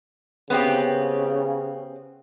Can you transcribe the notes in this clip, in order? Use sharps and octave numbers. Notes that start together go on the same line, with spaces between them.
C#3 B3 C4 G4